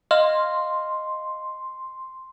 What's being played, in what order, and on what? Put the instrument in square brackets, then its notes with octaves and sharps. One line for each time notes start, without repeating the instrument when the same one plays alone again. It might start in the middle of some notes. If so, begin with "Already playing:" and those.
[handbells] D#5 F5 F6 [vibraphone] C6